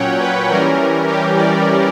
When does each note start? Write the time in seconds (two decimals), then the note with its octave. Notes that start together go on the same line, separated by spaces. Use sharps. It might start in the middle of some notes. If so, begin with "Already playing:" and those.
Already playing: A#2 F#3 C#4 C#5 F#5 G5
0.20 B4
0.49 E3 G3 C#4 A#4
1.07 G4
1.37 D5